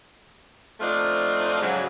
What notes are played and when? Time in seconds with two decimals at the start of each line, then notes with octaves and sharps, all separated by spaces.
0.80 F3 A3 C4 D4 D#4 F4
1.61 G#2 C#3 F#3